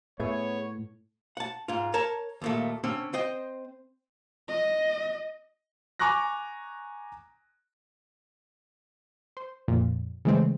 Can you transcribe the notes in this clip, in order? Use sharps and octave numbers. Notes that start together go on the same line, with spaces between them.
A2 B3 G#4 C#5 E5
F#5 A5
G#2 F4
A#4 C#5 A5 A#5
D#2 A#2 A3
D3 C4 C#4
C4 C5 D#5 G5
D#5
G#5 A#5 C#6 D6 F#6 A#6
C5
F2 A#2
C#3 E3 G#3 A3 C4